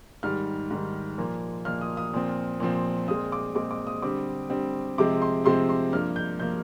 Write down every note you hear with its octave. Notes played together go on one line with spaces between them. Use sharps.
G#2 D#3 G3 F6
G#2 D#3 G3
A#2 F3 A#3
A#2 F3 A#3 F6
D#6
D#6
A#2 F3 C4
A#2 F3 C4
A#2 G#3 C4 D#6
D6
A#2 G#3 C4 D6
D6
D#6
D3 G3 C4 D6
D3 G3 C4
C3 F3 G#3 C4 D6
C6
C3 F3 G#3 C4 C6
C6
G2 F3 A#3 F6
G6
F3 A#3 G6